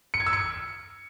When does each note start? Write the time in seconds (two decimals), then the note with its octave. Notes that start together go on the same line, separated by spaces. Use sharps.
0.14 C#7
0.20 G#6
0.26 E6
0.33 C#7